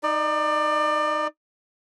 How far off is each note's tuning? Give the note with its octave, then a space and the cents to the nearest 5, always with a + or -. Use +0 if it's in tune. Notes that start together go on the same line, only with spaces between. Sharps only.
D#4 +0 D5 +30